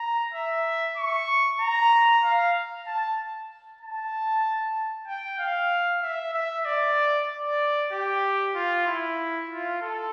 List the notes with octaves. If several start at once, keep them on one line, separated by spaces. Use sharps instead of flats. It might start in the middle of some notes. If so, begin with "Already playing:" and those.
Already playing: A#5
E5
C#6
A#5
F5
A5
A5
G5
F5
E5
E5
D5
D5
G4
F4
E4
F4
A4